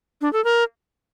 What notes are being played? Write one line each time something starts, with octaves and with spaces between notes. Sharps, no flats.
D4
A4
A#4